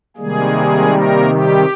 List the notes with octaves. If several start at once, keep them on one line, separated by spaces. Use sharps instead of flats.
C3 D#3 G3 G#3 A#3 G#4
A#3 A#4
G3 G4